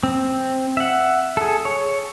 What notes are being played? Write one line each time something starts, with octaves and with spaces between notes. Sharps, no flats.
C4
E5 F#5
G#4 A4
C#5